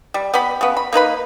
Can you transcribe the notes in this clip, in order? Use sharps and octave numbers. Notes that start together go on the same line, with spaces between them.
G3
B3 G4 B5
C#3 B3
B5
A#3 D#4 B4 B5